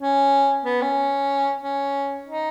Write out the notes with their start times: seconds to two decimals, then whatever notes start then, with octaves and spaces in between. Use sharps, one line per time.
0.01 C#4
0.64 B3
0.81 C#4
1.61 C#4
2.26 D#4